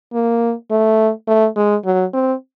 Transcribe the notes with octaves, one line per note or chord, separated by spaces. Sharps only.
A#3
A3
A3
G#3
F#3
C4